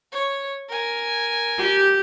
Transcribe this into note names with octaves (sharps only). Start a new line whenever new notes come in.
C#5
A#4 G#5
G4